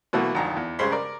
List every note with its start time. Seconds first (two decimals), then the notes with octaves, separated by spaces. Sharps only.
0.13 B2 E3 F#3 A3 A#3
0.34 G#1 F2 D3 A#5
0.57 E2
0.79 G2 C#3 G#3 C5 B5 C6
0.92 A#4 D5